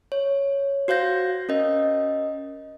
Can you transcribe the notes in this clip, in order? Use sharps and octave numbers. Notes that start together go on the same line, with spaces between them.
C#5
F#4 C5 F5 G6 A#6
C#4 A#4 D#5